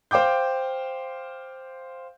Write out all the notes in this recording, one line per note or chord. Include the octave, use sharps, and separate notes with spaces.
C5 F5 G5 D6 G6